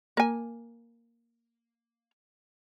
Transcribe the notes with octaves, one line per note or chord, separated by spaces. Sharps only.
A#3 G#5